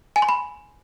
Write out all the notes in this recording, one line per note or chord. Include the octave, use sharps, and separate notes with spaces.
G#5
C6
B5